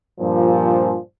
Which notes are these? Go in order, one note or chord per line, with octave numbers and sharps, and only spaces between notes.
G2 A#2 F3